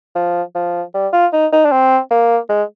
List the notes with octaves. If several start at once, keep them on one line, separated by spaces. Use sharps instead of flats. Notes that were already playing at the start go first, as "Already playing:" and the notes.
F3
F3
G3
F4
D#4
D#4
D4
C4
A#3
G#3